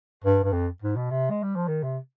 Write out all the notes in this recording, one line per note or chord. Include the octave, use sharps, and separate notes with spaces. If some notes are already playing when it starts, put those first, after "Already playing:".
G2
G2
F2
G#2
B2
C3
G#3
G3
F3
D#3
C3